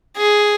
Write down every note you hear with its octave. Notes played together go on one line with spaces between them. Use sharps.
G#4